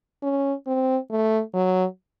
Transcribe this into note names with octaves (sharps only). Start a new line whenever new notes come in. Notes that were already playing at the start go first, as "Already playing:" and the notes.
C#4
C4
A3
F#3